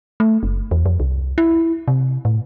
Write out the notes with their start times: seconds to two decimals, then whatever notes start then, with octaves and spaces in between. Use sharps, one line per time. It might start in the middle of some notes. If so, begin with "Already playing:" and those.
0.20 A3
0.43 F#1
0.71 E2
0.86 F2
1.00 C2
1.38 E4
1.88 C3
2.25 A2